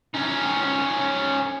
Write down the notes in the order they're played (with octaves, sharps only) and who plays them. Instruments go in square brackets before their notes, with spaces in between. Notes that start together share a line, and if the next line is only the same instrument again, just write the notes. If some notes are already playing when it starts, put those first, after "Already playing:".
[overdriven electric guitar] C#4 D#4